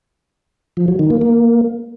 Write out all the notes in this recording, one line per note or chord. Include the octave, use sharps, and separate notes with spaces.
F3
F#3
D#3
A#3
A#3